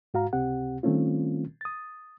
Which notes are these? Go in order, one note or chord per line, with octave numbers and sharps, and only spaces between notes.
G#2 F#4 F5 A#5
C#2 C3 C4 G4 F#5
D#3 G3 A3 C4 C#4 F4
D#6 A6